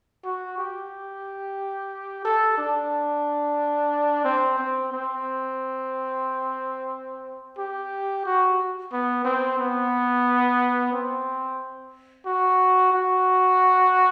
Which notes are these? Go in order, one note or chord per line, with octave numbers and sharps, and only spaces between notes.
F#4
G4
A4
D4
C4
C4
C4
G4
F#4
B3
C4
B3
C4
F#4
F#4